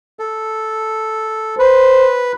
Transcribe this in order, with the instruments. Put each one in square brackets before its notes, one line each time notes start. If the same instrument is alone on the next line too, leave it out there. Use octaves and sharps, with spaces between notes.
[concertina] A4
[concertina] B4 [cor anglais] C5